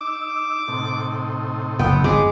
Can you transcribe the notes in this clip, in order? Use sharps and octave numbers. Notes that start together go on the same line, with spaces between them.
D#4 D6 E6
A2 C3 D#4
F#1 B3 G5
G1 F2 G#2 G#3 D6